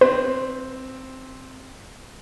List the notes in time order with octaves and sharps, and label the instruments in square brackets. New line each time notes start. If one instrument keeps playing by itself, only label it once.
[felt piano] C4 [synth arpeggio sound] B4 [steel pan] C5